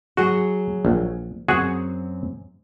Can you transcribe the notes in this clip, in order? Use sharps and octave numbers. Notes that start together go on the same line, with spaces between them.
F#3 F#4 G#4
A#1
F#2 C4 F#4 G#4 F#5